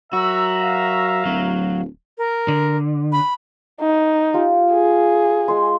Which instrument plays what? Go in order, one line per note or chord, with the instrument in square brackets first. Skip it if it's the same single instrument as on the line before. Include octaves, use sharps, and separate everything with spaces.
[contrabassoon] F#3 [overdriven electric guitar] F#4 [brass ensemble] A#4 E5 A#5 [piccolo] E6
[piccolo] F5
[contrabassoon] D1 [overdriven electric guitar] F#3
[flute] A#4
[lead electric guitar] D3
[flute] B5
[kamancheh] D#4
[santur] F4 G4
[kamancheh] G#4
[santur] G#3 C6